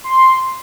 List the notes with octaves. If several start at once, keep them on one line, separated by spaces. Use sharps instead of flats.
C6